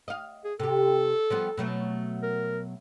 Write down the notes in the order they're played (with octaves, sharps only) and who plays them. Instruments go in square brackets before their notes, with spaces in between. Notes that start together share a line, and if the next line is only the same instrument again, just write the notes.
[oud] D#5 F5
[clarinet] G#4
[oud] C3 G4 [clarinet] A4
[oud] F3 G3 B3
B2 F#3 A3
[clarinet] A#4